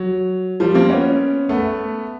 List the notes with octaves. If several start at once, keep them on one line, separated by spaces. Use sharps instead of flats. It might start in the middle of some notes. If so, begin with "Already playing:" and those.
Already playing: F#3
F3 G3
A#3 C4
B3 C#4
A3 B3